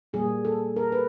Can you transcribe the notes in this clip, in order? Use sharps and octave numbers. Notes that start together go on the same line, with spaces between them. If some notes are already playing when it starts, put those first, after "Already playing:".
A#2 G3 A#3 G#4
A4
A#4
B4